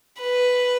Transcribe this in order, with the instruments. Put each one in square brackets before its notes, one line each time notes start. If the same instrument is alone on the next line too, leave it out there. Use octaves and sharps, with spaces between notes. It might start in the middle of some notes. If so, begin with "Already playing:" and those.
[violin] B4